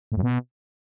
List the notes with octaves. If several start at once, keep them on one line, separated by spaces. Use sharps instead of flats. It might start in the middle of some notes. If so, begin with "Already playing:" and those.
A2
F#2
B2